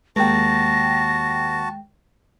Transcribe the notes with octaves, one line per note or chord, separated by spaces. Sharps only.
D#2 G#3 F#4 G5 A5 A#6